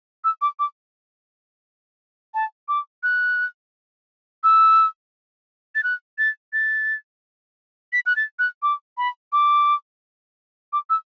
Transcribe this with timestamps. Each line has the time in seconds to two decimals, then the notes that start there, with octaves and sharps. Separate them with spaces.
0.24 E6
0.42 D6
0.59 D6
2.34 A5
2.68 D6
3.03 F#6
4.44 E6
5.75 A6
5.84 F#6
6.18 A6
6.53 A6
7.93 B6
8.06 F#6
8.16 A6
8.39 F#6
8.63 D6
8.98 B5
9.33 D6
10.73 D6
10.90 E6